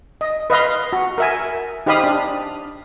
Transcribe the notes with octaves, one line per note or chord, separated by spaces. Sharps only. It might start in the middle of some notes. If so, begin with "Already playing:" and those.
D#5
B4 D#5 F5 C6
F#4
A#4 E5 G#5
D#4 G4 C5 F5 B5 D#6
D4